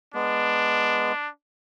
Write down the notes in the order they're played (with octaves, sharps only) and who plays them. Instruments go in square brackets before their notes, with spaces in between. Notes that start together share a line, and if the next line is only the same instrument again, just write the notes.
[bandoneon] G#3 B3 [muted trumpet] D4